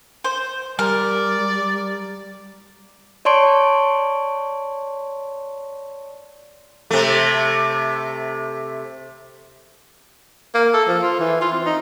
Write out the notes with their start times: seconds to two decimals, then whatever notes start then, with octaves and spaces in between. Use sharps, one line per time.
0.24 C5
0.79 G3 A#4 D5
3.25 C#5 D5 A5 C6 C#6 D7
6.91 C3 A3
10.55 A#3
10.74 A4
10.88 F3
11.02 F4
11.20 E3
11.41 F4
11.53 C4
11.66 D#4